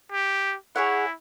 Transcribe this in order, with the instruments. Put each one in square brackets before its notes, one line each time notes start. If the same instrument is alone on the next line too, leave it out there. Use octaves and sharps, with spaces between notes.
[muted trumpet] G4
[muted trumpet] E4 [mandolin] G#4 C#5 F#5